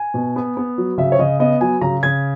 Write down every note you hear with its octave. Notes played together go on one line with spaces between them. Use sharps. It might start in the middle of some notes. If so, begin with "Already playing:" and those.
Already playing: G#5
B2
B3
B3
F#3
C#3 E5
C#5
C#3 D#5
B3 D#5
F#3 G#5
C#3 A#5
C#3 G#6